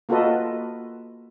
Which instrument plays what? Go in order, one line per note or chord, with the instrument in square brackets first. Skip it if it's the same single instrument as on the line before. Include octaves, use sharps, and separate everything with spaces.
[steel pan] A#3 F4 F#4 A4 B4 D#5